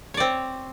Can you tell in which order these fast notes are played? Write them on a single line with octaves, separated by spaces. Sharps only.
C#5 D5 C4